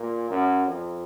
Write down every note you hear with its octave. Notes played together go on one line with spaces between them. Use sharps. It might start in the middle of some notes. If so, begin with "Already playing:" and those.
Already playing: A#2
F#2
F2